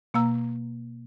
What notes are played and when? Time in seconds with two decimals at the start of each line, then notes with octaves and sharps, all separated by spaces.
0.14 B2 A#3 F5 A#5 E6